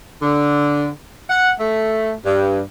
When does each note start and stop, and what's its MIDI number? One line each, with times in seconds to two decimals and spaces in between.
0.21 0.87 50
1.29 1.51 78
1.59 2.13 57
2.24 2.60 43